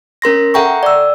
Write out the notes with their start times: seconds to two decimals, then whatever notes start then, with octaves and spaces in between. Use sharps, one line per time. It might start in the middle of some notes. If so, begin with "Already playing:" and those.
0.22 C#4 A#4 C6 A#6
0.54 A4 E5 F#5 G5 A#5 C#6
0.83 D5 E6